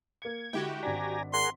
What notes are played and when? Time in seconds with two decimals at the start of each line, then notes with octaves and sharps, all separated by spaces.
0.22 A#3 G#6 C#7
0.53 D3 G#3 E4 F#4 G4 G5
0.83 G#1 D4 D5 G#5 A#5 B6
1.34 G#4 A#4 F#5 C6